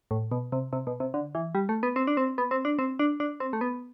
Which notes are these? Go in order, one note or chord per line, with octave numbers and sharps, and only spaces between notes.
A2
B2
C3
C3
B2
C3
D3
E3
G3
A3
B3
C4
D4
C4
B3
C4
D4
C4
D4
D4
C4
A3
B3